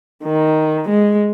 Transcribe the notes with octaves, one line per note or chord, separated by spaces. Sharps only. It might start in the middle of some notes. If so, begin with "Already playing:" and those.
D#3
G#3